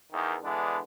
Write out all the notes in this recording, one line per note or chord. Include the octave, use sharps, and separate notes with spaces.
E2 D#3
D3 E3 G#3 B3 D4